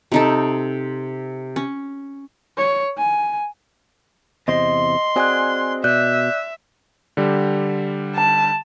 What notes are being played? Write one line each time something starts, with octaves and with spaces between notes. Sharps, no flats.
C3 D#4 A4
C#4
C#5
G#5
E2 C3 C5 D#5 C6
C4 F#4 G#4 D5 G#5 F#6
B2 D5 E5 F#6 G6
D3 G3 G4
A5